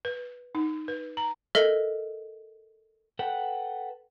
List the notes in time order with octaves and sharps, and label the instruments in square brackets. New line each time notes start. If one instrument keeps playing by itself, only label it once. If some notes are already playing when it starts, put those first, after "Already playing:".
[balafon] B4
D#4
B4
A#5
[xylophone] A4 A#4 D#5 E5
[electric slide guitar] A4 B4 F#5 G5